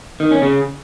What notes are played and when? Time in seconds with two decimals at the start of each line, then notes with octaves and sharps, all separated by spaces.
0.20 D#3
0.31 C#4
0.42 C#3